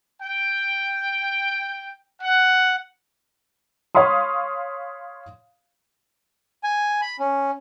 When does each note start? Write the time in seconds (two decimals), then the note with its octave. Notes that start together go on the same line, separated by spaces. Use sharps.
0.21 G5
2.21 F#5
3.95 C#5 F5 B5 C6 D#6
6.63 G#5
7.02 B5
7.19 C#4